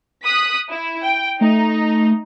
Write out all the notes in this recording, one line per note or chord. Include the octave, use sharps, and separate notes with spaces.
D#6 F#6 B6
E4
G5
A3 D#4